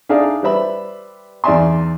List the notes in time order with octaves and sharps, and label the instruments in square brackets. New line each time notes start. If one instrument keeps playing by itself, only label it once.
[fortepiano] D4 D#4 G#4 D5 E5 F5
G3 B4 C5 E5 B5
E2 D#4 D5 E5 G#5 C6